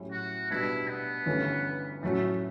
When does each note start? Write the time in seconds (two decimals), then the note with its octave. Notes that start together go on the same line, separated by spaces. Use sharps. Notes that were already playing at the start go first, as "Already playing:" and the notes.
Already playing: A2 F#3 C#4 E4 G4
0.12 F#4
0.50 B2 G3 D4 E4
0.88 B3
1.26 G1 G2 E3 A3 C#4
2.03 A2 F#3 A3 C#4 F#4